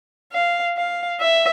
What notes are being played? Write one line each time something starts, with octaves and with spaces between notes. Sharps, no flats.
F5
F5
E5